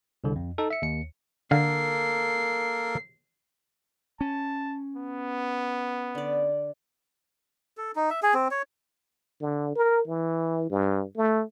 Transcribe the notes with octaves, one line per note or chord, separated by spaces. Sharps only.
C2 D3
F2
D#4 A4
E5 C#7
D#2 C#7
D3 A#3 A4 A#4 F5 C7
C#4 A5
B3
D3 D5
A4
D#4
E5
G#4
C4
C#5
D3
A#4
E3
G2
A3